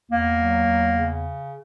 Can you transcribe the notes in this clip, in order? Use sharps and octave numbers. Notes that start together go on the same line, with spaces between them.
E2 A#3
F#3
E2
C#3